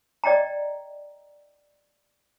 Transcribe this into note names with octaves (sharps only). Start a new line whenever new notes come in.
D5 D#5 G5 A#5